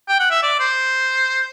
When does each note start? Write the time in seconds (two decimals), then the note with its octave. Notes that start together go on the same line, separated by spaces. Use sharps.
0.08 G5
0.20 F#5
0.31 E5
0.43 D5
0.60 C5